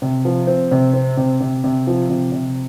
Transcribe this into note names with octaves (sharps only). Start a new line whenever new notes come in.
C3
F3
C4
C3
C4
C3
C3
C3
F3
C3
C3